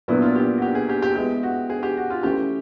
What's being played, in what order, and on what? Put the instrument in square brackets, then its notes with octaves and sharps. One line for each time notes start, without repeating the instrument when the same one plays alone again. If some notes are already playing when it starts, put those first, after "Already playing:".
[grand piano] A#2 F#3 B3 D4 [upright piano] E4
[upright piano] F4
G4
F#4
G4
G#4
G4
G4
[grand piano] G#3 B3 E4 [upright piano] G4
[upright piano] F#4
G#4
G4
F#4
F4
[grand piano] E3 A3 C#4 [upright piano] G4